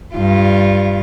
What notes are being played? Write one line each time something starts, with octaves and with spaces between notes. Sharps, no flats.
G2 F4